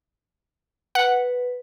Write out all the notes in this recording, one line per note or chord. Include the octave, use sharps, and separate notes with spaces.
B4 F#5